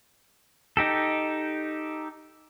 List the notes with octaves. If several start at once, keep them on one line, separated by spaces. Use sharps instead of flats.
D#4 G4 A4